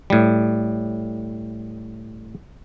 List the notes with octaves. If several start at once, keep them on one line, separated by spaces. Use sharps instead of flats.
A2 G3